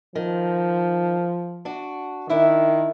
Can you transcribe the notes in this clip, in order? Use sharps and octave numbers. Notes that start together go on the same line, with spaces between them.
D#3 F3
D4 F#4
D#3 D4 E4 E5